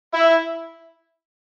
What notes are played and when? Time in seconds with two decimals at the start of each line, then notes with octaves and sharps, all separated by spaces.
0.12 E4